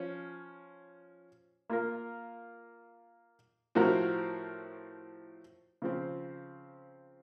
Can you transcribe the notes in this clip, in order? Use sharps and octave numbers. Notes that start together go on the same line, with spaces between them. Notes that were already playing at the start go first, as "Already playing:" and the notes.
Already playing: F3 C#4
A#3 F4 A#4
A2 F3 C4 F#4 A#4
C#3 F3 C4